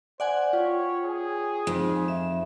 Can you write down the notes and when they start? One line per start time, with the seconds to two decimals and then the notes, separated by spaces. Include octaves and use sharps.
0.20 C5 D5 F#5 G#5
0.53 F4 C#5 G5
1.05 G#4
1.67 F2 D#4
2.08 E5 E7